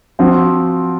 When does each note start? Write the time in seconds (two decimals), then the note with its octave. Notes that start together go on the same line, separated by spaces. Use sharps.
0.19 F3 C4 F#4